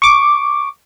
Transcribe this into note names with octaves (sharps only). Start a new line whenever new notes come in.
C#6 D6